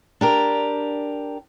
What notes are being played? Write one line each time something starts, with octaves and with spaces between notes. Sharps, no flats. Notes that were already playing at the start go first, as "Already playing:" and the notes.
D4 G4 A#4